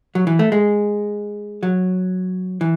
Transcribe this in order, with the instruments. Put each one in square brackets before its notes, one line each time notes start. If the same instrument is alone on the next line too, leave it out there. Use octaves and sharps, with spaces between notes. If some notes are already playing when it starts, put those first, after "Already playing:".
[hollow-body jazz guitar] F#3
E3
A3
G#3
F#3
E3